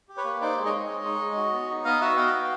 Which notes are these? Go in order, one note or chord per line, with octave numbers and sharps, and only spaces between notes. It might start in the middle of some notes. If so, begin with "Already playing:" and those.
G4
B4 C#5
A#3
D#4 C5 D5
G#3
C#5 D#5
C4
G#3
D#4
G#3
F#4
B3
D#4
B3 D#5 F5
F#4 E5 F#5
B3 F5 G5
F#4